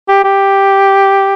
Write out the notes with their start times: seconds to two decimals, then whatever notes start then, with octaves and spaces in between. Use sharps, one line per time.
0.08 G4
0.24 G4